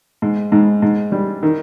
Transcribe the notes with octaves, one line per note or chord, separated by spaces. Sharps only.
G#2
G#2
G#2
G3
D#3